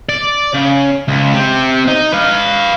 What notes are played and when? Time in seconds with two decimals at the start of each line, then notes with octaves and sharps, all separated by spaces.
0.09 D5
0.54 C#3
1.08 C#2
1.34 C4 G4
1.87 D#4
2.12 B4 F5